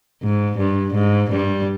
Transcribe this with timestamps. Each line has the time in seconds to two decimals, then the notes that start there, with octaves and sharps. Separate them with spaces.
0.22 G#2
0.58 G2
0.94 G#2
1.30 G2 G3